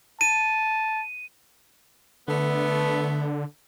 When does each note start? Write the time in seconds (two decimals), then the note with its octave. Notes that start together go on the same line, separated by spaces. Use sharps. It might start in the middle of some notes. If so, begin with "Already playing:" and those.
0.21 A5 D#7
2.28 D3 A3 B3